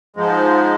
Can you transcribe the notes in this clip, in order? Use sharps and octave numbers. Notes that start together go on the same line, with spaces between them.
G#2 F3 G#3